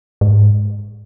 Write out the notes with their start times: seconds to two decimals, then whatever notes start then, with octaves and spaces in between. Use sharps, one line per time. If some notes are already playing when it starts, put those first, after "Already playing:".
0.21 G#2